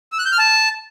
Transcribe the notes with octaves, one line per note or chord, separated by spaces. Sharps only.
E6
F#6
G6
F6
A5